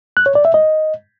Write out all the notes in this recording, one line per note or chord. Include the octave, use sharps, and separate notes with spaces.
F#6
C#5
D5
E5
D#5